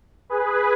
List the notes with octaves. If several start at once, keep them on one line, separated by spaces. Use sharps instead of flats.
G#4 B4